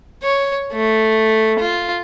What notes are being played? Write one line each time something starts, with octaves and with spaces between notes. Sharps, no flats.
C#5
A3
F4